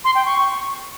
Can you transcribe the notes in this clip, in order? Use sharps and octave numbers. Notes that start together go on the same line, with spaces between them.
C6
G5
C#6